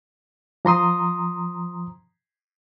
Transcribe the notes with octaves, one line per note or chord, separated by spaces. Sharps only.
F3 A#5 C6 D#6